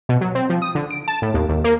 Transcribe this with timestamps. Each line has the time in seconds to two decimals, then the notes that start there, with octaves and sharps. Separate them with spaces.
0.09 B2
0.21 F#3
0.35 C4
0.50 F3
0.62 D#6
0.75 D3
0.91 D7
1.08 A5
1.22 A2
1.34 D#2
1.49 D#2
1.64 A#3